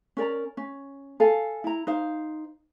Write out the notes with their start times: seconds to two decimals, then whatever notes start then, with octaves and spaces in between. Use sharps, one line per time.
0.17 C#4 A#4 D5 A#5
0.57 C#4
1.20 A4 F5 G#5
1.64 E4 A#5
1.87 D#4 C5 F5